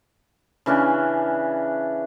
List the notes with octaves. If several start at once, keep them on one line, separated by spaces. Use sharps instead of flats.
C#3 E3 C#4 D4